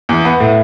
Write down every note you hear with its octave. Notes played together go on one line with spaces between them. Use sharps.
E2
B3
A2